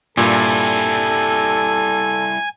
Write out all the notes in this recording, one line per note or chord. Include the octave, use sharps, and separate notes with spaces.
G2 A#2 G3 E4 A4 G#5